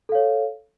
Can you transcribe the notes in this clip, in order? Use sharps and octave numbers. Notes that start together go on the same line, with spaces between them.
A4 C#5 F5